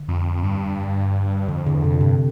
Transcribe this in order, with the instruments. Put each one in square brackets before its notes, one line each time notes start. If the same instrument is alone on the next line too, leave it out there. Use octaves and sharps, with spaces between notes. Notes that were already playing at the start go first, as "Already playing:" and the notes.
Already playing: [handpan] D3
[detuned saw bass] F2
G2
[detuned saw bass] F2 [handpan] D3
[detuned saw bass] E2 [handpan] D3
[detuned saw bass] F2 [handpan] C3
[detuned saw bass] G2 [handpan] C3